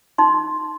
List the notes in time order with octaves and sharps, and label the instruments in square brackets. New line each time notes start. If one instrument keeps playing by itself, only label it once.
[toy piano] D#4 C6